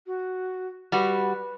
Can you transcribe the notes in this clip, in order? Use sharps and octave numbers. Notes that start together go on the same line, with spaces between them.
F#4
G3 F#4 B4